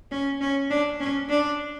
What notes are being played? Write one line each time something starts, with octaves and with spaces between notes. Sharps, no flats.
C#4
C#4
D4
C#4
D4